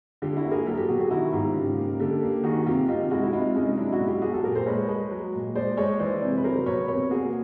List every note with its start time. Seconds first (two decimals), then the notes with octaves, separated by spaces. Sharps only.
0.22 D3 F4 G4
0.36 E4 F#4
0.44 A#3
0.51 G#4 A#4
0.66 F#3 G4 A4
0.77 G4 A4
0.88 B2 F#4 G#4
0.99 F#4 G#4
1.11 D#3 E4 F#4
1.33 G#2 F4 G4
1.55 C#3
1.78 A#3
2.00 D3 G4 A4
2.22 A#3
2.44 D#3 F#4 G#4
2.66 C3 F4 G4
2.88 C3 D#4 F4
3.11 G#3 E4 F#4
3.23 E4
3.33 C3 D#4 F4
3.55 G#3 C#4 D#4
3.77 F#3 D4 E4
3.92 E4 F#4
3.99 B2
4.07 F4 G4
4.22 F#3 F#4 G#4
4.33 G4 A4
4.44 A#2 G#4 A#4
4.55 A#4 C5
4.66 G#3 B4 C#5
4.89 G#3
5.11 F#3
5.33 A#2
5.55 G#3 C5 D5
5.77 G#3 C#5 D#5
6.00 E3 C5 D5
6.22 C3
6.37 B4
6.44 F#3 A#4 C5
6.66 B2 B4 C#5
6.88 C3 B4 C#5
7.11 A#3 F#4 G#4